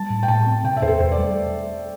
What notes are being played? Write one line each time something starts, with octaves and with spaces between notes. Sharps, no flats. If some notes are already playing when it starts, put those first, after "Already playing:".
Already playing: G3 A5
A2
G5
A2 A5
C4
C3 G5
E5
E2 C5
A4
E2 C5
D5
G3